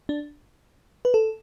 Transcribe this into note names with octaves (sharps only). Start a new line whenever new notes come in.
D4
B4
A4